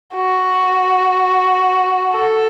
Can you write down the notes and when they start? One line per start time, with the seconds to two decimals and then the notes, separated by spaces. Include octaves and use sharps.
0.15 F#4
2.12 A4